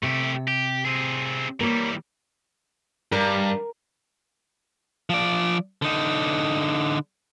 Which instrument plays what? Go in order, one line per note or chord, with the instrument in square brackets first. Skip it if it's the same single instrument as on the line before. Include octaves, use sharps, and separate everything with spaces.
[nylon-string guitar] C3 [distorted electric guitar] A3 G4
[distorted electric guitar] G4
C4 G#4
[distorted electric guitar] E3 G3 [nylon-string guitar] A#3 C#5
[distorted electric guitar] G2 [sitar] A#4
[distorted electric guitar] F3 D5
D3 D#4